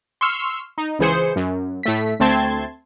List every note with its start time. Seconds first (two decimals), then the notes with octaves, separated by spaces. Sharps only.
0.21 C6 C#6 E6 F6
0.78 D#4
0.99 C#2 E3 G#4 C5 C#7
1.36 F#2
1.83 A2 A3 B6
2.20 D2 A3 C4 A5 C6 G#6